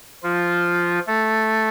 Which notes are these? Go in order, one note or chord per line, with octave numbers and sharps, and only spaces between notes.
F3 F4
A3 A4